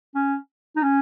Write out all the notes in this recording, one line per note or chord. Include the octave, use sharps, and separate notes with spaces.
C#4
D#4
C#4